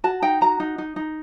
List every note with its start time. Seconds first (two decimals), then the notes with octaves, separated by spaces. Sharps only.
0.04 F#4 A5
0.22 D#4 G5
0.41 F#4 A#5
0.60 D#4
0.78 D#4
0.96 D#4